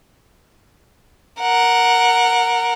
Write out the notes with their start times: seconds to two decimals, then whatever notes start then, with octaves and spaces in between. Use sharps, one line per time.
1.41 A#4 F#5